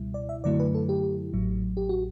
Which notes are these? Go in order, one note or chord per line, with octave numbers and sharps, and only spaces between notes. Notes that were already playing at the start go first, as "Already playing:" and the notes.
Already playing: C#2 B2 G3 E4
D5
E5
F#2 D3 F#3 A3 E4 D5
B4
A4
G4
A1 A2 F#3
G4
F#4